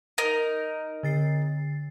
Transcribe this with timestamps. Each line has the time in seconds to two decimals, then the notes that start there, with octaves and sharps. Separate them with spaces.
0.18 D#4 A#4
1.03 D3 A6 C7